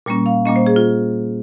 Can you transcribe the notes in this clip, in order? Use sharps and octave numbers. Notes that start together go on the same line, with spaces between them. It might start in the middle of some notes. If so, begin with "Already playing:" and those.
A#2 G3 A#3 C#4
F5
A#2 G3 A#3 C#4 D#5
C5
G#4
F4